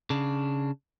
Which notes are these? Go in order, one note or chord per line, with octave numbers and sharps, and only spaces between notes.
C#3 D4